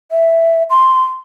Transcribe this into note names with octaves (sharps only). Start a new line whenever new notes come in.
E5
C6